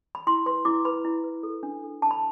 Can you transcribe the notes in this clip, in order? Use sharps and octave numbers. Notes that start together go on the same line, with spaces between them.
B5
E4 C6
B4 C6
E4 D6
B4 B5
E4
B4
A4
D4
A4
D4 A5
B5